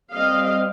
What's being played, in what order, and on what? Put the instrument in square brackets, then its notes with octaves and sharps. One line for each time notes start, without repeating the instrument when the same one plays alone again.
[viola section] G3 C4 D#5 F5